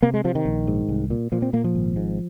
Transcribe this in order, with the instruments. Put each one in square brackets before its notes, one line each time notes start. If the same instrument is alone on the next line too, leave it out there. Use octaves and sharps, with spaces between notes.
[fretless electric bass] C3 A#3
G#3
C3 F3
D#3
A#1
G#2
C2
A#2
A#2 F3
C4
A#2 A#3
F3
G#1
G#2